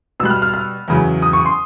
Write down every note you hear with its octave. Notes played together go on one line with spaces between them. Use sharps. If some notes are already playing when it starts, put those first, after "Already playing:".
B2 G3 E6 F#6
F6
F6
F6
E2 C#3 F#3
D#6
C#6
C6